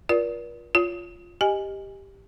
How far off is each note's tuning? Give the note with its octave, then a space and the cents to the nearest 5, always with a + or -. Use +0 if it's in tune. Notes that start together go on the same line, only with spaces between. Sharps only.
F4 +0 A#4 +45 D5 -20
F4 +0 C#5 +35
G4 +5 D#5 +0 G#5 -10